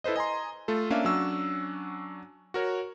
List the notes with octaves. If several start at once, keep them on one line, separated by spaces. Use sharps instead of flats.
E4 A4 B4 C5 D#5
D#5 G#5 A#5 C6
A3 F4 A4
A#3 C#4 D4 E5 F5
F#3 C#4 D4 F#4 E6
F#4 A#4 C#5